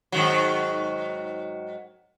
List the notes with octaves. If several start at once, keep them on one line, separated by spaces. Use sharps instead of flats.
G#2 D#3 F#3